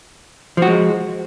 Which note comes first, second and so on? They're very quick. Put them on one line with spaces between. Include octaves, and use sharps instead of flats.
F3 F#4 G#3